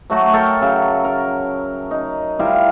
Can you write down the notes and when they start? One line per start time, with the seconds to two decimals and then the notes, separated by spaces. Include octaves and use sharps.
0.10 F#3 A3 F#4
0.34 A4 A#4 E5 G5
0.61 C#3 F#3
1.04 A#4
1.91 D#4
2.39 G3 E4 F4 A#4